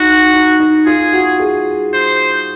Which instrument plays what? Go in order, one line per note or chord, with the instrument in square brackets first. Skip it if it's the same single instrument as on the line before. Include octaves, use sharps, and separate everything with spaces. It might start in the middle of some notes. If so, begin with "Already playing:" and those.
Already playing: [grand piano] D#4 [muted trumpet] F#4
[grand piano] D#4
D#4
[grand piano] F4 [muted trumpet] G#4
[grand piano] F#4
G#4
[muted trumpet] C5